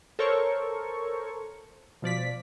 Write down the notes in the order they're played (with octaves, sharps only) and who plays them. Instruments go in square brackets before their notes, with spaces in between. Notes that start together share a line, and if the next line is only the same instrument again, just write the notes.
[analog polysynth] A4 A#4 C5 C#5 C#6
B2 F3 D5 B6